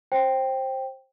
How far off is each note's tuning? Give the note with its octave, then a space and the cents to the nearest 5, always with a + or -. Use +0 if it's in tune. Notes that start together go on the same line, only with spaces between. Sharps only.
C5 +20 G5 +0